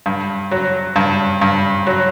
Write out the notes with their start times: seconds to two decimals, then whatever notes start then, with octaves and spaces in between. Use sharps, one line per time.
0.06 G2
0.51 F#3
0.96 G2
1.41 G2
1.87 F#3